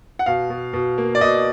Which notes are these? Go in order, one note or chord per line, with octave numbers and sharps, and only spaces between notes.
F#5
B2 F5
B2
B2
A#3
D5
B2 D#5